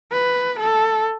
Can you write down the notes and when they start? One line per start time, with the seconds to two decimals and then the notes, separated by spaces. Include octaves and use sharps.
0.12 B4
0.60 A4